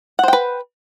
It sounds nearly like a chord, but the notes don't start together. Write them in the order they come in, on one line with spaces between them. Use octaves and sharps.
F#5 C5 G5 B4